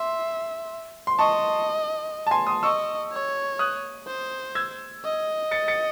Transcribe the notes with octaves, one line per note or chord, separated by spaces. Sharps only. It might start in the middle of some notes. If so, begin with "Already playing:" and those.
Already playing: E5 C6
C6
D#5 A5 C#6
A5
G#5 C6
C6 D#6
D#5 C#6 E6
C#5
D#6 F#6
C5
E6 G#6
D#5
A6 C#7
A6 C#7